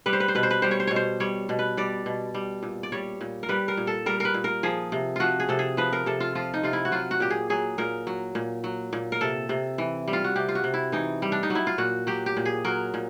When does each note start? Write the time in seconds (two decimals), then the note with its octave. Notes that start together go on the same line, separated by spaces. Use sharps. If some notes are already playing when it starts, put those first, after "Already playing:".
0.06 G3 B4
0.13 C5
0.20 B4
0.28 C5
0.35 B2 B4
0.43 C5
0.51 B4
0.62 G3 C5
0.71 C#5
0.80 C5
0.87 B2 C#5
0.96 C5
1.20 G3 C#5
1.49 B2
1.59 B4
1.77 G3 D5
2.06 B2
2.34 G3
2.63 A#2
2.83 D5
2.92 G3 C#5
3.21 A#2
3.43 A#4
3.49 G3 B4
3.68 A#4
3.77 A#2
3.87 A4
4.06 G3 A#4
4.20 A#4 B4
4.34 A#2
4.44 A#4
4.63 F3 G#4
4.92 C3
5.16 F3 F4 F#4
5.40 G#4
5.49 C3 A4
5.59 G#4
5.77 F3 B4
5.93 A#4
6.06 C3 A4
6.20 F4
6.35 F3 F4
6.54 D#4
6.63 C3 F4
6.73 E4
6.85 F#4
6.92 F#3 F4
7.11 F#4
7.20 A#2 G4
7.30 G#4
7.50 F#3 G#4
7.78 A#2 A#4
8.07 F#3
8.35 A#2
8.64 F#3
8.93 A#2
9.12 A#4
9.21 C3 A4
9.49 C3
9.78 E3
10.08 G3
10.13 F4
10.24 F#4
10.36 C3 G4
10.49 F4
10.55 F#4
10.64 C3
10.74 E4
10.92 E3 D#4
11.22 G3
11.32 D4
11.43 D#4
11.50 F#3
11.55 E4
11.67 F4
11.78 A#2 F#4
12.07 F#3 G4
12.26 G4
12.37 A#2
12.45 G#4
12.65 F#3 A#4
12.94 A#2